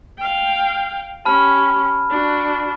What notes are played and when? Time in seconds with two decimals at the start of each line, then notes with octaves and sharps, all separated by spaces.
0.18 F5 G5
1.25 C#4 G4 A5 B5 F6
2.10 D4 F#4